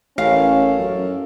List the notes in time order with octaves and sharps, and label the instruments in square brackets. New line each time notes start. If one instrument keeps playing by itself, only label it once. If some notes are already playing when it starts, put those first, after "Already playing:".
[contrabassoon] A1 [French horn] C#4 [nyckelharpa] A4 A#4 [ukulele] F5
[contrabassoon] F#2